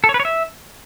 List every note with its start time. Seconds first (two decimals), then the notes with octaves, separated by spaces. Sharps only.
0.04 A4
0.09 C#5
0.14 B4
0.20 C#5
0.25 E5